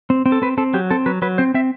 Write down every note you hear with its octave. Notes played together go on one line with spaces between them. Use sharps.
C4
C4
A4
C4 B4
C4 A4
F#3 G4
C4 A4
F#3 B4
F#3 B4
C4 C5
C4 E5